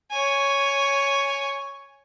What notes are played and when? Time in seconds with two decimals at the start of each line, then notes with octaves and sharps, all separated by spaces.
0.11 C#5 G#5